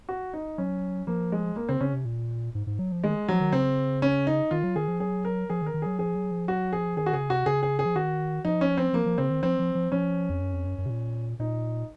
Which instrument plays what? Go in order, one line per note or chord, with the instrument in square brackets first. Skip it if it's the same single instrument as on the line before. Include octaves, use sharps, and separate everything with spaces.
[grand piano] F#4
D#4
[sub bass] F#3 [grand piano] C#4
[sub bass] F3 [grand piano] A#3
[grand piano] G#3
A#3
[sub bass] C#3 [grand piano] C4
[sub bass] C#3 [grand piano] C#4
[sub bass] C3
A#2
G#2
G#2
F#3
F3
[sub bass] D#3 [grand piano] G#3
[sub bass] F3 [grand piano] F#3
[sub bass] D#3
[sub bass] C#3 [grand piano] C4
[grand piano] C#4
D#4
[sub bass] D#3 [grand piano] F4
[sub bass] F#3
[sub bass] D#3 [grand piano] G#4
[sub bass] F3
[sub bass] F#3 [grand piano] G#4
[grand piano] A#4
[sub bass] F3 [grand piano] G#4
[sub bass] D#3
[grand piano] A#4
[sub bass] D#3
[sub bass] F#3 [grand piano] G#4
[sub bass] F3 [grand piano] G#4
[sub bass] F#3
F3
[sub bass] F#3 [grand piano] F#4
[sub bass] F3 [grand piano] G#4
[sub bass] D#3 [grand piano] G#4
[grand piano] F#4
[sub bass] C#3 [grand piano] G#4
[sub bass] C3 [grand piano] F#4
[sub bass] C#3 [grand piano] G#4
[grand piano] G#4
G#4
[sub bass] F3
[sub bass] D#3 [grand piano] F#4
[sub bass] F3 [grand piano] D#4
[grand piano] C#4
C4
[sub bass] F3 [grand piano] A#3
[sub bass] F3
[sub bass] C#3 [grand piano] C4
[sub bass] D#3
[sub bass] F3 [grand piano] C4
[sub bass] F3
F3
[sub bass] F3 [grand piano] C#4
[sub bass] F2
F#2
F2
F#2
F#2
C3
A#2
[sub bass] A#2 [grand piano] D#4